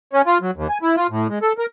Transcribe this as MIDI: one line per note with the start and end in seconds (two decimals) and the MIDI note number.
0.13 0.22 61
0.26 0.38 65
0.42 0.51 54
0.56 0.67 39
0.69 0.78 80
0.82 0.96 64
0.97 1.07 65
1.10 1.27 45
1.29 1.39 56
1.42 1.53 69
1.58 1.66 70